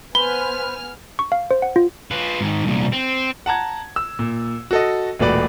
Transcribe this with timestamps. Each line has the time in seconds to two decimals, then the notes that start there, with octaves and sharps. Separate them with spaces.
0.15 B3 B4 C5 G#5 B5 F6 G7
1.19 C#6
1.32 F5
1.51 C5
1.62 F#5
1.76 F4
2.11 F4 B4
2.41 G#2 D#3
2.64 C2 A#2
2.92 C4
3.46 F#5 A5 A#5 G#6
3.96 E6
4.19 A#2
4.71 F#4 A4 D#5
5.19 E1 A#2 A3 F#4 B4 D5